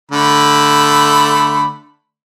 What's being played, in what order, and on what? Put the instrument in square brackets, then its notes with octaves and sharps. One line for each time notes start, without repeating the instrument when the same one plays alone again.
[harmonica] D3 A3 B5